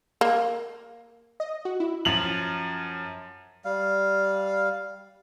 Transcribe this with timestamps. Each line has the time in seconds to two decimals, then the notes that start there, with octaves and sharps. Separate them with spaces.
0.21 A#3
1.40 D#5
1.65 F#4
1.80 E4
2.05 F#2 F3 F7 F#7
3.65 G3 F5